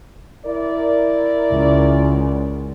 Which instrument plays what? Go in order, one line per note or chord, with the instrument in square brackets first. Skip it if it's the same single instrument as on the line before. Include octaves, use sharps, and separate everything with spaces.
[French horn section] E4 A#4 D5
[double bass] C#2